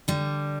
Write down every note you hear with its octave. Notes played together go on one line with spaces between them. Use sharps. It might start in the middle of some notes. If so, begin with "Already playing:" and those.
D3 G3